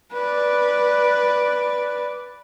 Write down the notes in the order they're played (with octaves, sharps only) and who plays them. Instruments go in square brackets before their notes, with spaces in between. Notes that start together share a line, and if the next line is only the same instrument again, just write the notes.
[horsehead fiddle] B4 D5